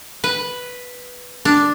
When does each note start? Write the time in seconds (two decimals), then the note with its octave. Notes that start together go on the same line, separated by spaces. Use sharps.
0.24 B4
1.45 D4